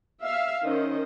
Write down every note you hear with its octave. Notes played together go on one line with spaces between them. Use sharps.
E5 F5
D#3 C#4 C5 D#5